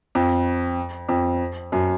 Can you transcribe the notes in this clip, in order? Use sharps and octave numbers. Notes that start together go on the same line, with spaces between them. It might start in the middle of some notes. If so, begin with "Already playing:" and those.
F2
F2
F#2